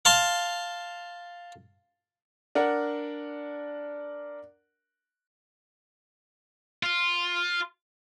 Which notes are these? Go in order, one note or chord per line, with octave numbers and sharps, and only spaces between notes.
F5 A5 C6
D4 A#4 F#5
F4